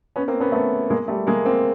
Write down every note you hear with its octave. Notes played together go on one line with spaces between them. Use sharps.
B3 C#4
A#3 C4
B3 C#4
A3 B3
G#3 A#3
G3 A3
G#3 A#3
A#3 C4